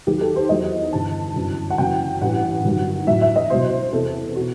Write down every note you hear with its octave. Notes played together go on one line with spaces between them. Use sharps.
D#2 D#3 F#3 G4
A4
C5
E2 D#3 F#3 D#5
G1 G2 E3 A5
G1 F#2 E3
F#5
F#1 F#2 E3 G5
A1 G2 E3 F#5
G1 G2 D#3 F#3
A1 A2 F#3 E5
E5
D#5
C2 B2 F#3 C5
E2 C3 E3 A4
B2 F#4